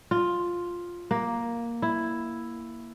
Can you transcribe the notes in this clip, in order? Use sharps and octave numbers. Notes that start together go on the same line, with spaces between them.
F4
A#3
E4